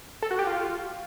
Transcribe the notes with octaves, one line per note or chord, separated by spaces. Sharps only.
A4
F#4
G4
F4